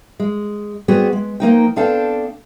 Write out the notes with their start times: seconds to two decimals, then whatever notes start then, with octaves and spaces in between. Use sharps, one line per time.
0.20 G#3
0.88 G3 B3 C4 F#4 G#4
1.13 G#3
1.40 F3 A#3 D#4 G5
1.76 B3 C4 D4 A4 F5 G5